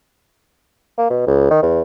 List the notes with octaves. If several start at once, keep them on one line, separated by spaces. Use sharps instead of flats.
A#3
B2
C#2
D#3
E2